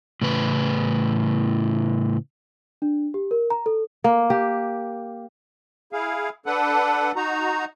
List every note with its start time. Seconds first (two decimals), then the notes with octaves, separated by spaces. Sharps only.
0.21 A2 C#3 E3 B4
2.82 D4
3.14 G4
3.31 A#4
3.50 A#5
3.66 A4
4.04 A#3
4.30 G4
5.93 E4 G#4 F5
6.46 D4 A4 B4 F#5
7.16 D#4 F#4 A#5